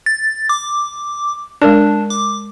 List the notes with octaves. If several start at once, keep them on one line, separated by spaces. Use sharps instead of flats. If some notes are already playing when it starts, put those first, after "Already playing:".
A6
D6
G#3 D4 A#4 D5
D6